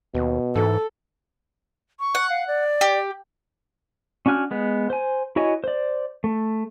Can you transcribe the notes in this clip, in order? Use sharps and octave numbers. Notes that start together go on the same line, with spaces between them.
D#2 B2
G#2 E3 A4
C#6
F#5
F5
D5
G4
C#4 D4 F#4 G#5 F6
G#3 B3
C5 G#5
E4 F#4 C#5 D#5 G#5
C5 D5
A3